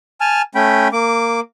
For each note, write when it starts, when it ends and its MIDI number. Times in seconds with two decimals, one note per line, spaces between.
0.21 0.42 80
0.21 0.42 81
0.21 0.42 89
0.55 0.88 57
0.55 0.88 61
0.55 0.88 79
0.55 0.88 83
0.93 1.40 58
0.93 1.40 86